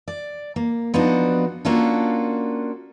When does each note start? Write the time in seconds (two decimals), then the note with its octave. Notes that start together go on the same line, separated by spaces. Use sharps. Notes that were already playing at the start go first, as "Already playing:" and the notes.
0.08 D5
0.56 A#3
0.94 F3 B3 D4 D#4 F#4
1.65 A#3 C#4 D4 F4 F#4 A4